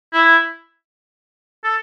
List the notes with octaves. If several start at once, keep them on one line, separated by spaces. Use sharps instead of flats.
E4
A4